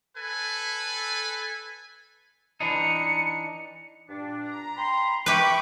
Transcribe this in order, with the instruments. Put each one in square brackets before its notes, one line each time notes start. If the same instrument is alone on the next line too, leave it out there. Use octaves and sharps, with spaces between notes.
[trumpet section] A4 B4 G#5
[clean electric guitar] E3 D4 D#4 [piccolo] C#7
[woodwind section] G2 A#2 D4
[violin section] A#5
[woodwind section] G5 B5 C6
[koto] G4 B4 [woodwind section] E5 [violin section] B5 C#6 D6